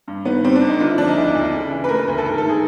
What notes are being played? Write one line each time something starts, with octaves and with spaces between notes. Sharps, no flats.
G2
D#3 B3
G3 C4
D4
G1
D#4
D3 F4
E4
F3 D4
D#4
D2 E4
D2
C#3
E3
B4
A3 A#4
B4
D2 A#4
A4
G#2 A#4
A4
D#3
G#4